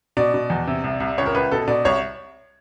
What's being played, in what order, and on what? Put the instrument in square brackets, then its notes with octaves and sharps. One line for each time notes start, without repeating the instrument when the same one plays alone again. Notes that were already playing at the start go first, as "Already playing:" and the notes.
[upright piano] B2 D5
B2
E2
C3
C2
C2
C#2 C#5
A#4
C#2 B4
B2 A4
B2 D5
C2 C#5